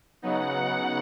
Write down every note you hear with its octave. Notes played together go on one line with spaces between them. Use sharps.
C#3 F#3 B3 D#4 F#5